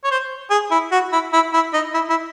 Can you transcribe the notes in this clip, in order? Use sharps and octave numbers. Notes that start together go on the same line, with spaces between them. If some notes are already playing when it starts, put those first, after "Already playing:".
C#5
C5
G#4
E4
F#4
E4
E4
E4
D#4
E4
E4